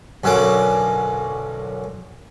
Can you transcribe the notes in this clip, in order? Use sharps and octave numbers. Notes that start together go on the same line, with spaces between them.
B1 F#2 D3 C#4 D6 D#6